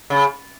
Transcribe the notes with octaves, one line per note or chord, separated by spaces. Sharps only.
C#3